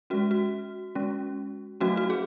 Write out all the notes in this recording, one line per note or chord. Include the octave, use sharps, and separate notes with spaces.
G#3 C#4 F#4
F#4
G#3 C#4
F#3 A3 C#4 F#4
F#4
G#4